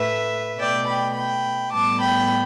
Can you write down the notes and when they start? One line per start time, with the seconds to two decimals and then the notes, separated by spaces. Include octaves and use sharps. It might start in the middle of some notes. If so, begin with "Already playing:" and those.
Already playing: A2 A3 B4 E5
0.58 B2 A3 D5 G5
0.87 G5 B5
1.15 G5 B5
1.73 A2 G3 B3 A5 D6
2.00 G5 B5